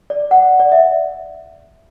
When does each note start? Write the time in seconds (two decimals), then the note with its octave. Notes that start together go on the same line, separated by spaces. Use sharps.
0.10 D5
0.31 F#5
0.60 D5
0.72 E5